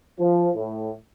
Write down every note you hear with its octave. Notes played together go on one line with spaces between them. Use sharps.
F3
A2